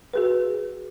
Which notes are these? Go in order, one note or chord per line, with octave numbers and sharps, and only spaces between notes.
F#4 G#4 B4